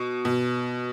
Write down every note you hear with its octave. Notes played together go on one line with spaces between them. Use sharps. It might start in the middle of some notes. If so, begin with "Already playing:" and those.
Already playing: B2
B2